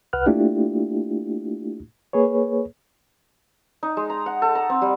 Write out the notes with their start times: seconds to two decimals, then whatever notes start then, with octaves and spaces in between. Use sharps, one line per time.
0.13 C2 B4 F#5 F6 F#6
0.26 A3 A#3 D4 E4 F4 G4
2.13 A#3 G#4 B4 C#5
3.83 D#4
3.97 G#3
4.10 A#5
4.26 F#5
4.42 A4
4.55 A#5
4.70 C4
4.82 G3